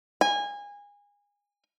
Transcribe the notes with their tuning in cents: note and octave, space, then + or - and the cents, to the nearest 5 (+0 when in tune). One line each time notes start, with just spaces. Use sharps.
G#5 -25